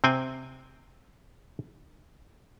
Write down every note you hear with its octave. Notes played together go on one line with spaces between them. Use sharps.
C3 C4 G5 G#5